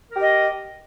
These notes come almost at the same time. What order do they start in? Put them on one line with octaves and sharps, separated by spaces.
A#4 G4 D#5